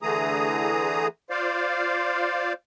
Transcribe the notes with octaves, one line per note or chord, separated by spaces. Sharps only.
D3 E3 A3 G#4 A#5 D#6
F4 C5 D5 F5